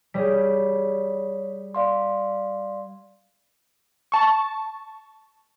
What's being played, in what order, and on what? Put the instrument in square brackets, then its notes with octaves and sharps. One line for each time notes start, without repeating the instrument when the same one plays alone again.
[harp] G3 G#4 [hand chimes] C#5 B6
[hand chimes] D5 F5 C6
[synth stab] A5 C#6